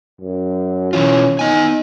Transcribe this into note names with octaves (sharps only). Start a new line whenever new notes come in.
F#2
B2 E3 C#4 F4
B3 D#4 G#5